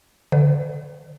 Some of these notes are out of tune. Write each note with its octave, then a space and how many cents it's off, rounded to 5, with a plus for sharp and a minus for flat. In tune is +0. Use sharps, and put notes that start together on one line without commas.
D3 +0 B4 +45